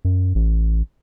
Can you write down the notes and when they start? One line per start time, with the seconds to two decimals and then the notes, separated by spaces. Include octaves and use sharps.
0.05 F#2
0.35 A1